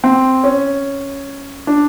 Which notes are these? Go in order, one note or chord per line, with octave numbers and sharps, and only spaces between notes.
C4
C#4
D4